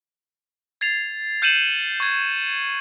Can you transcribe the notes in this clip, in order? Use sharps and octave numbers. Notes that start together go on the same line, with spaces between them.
G#6 A6 C7 F7
F6 G6 C#7 D#7 E7 F#7
C#6 G#6